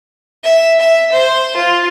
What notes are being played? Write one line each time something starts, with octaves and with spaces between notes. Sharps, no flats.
E5
E5
C5
F4